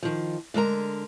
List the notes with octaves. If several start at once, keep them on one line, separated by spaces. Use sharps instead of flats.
D#3 F3
D3 G#3 A#4 A#5